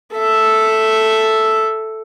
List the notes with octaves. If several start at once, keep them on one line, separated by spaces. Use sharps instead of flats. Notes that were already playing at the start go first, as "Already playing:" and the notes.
A4 E5